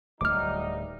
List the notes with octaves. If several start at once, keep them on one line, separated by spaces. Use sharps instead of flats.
D1 D2 F#3 G3 A3 D#4 D6 F6